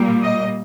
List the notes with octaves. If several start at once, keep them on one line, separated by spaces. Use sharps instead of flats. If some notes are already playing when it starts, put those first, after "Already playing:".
Already playing: A#2 G3 A#3
D#5